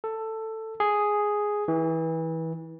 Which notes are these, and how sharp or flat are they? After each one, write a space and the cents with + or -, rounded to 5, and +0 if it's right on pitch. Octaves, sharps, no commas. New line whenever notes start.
A4 +10
G#4 +0
E3 -25